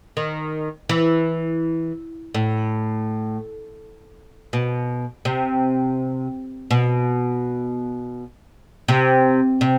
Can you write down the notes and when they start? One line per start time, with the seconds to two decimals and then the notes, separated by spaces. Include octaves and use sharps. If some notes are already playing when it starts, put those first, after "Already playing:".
0.17 D#3
0.89 E3
2.35 A2
4.53 B2
5.25 C3
6.71 B2
8.88 C3
9.61 C3